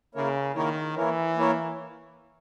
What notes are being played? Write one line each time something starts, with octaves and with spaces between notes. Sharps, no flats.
C#3 A#3 E4 A#4 C#5
D#3 A#3 E4 A#4 C#5
E3 A#3 E4 A#4 C#5
A#3 E4 A#4 C#5